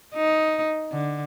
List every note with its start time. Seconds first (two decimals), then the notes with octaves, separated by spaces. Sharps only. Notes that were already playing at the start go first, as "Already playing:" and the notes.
0.15 D#4
0.92 D3